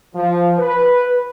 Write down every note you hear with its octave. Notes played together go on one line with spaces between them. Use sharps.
F3
B4